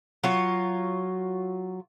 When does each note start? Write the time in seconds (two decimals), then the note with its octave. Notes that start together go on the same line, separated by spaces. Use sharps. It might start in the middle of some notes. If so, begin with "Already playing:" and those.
0.24 F#3 F4 C#5